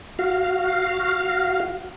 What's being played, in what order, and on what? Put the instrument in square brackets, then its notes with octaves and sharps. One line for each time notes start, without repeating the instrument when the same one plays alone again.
[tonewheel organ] F#4 F5